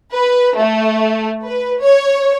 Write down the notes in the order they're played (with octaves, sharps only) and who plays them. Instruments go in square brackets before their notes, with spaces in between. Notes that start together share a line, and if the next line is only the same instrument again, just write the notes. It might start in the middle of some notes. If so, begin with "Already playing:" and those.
[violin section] B4
A3
B4
C#5